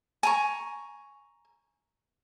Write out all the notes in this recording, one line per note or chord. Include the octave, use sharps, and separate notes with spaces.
G#5 A#5 C#6